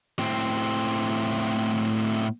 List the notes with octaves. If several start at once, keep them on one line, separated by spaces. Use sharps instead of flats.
A2 C4